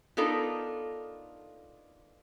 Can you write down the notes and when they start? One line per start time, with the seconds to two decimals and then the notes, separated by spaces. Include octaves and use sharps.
0.17 B3 D4 D#4 F4 A4 A#4